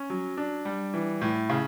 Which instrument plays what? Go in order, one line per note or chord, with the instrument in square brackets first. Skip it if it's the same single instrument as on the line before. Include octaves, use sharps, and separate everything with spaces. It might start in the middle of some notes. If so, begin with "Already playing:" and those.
Already playing: [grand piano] C#4
F#3
D4
G3
E3
A2
C#3